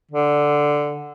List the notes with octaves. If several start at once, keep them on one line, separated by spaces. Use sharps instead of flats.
D3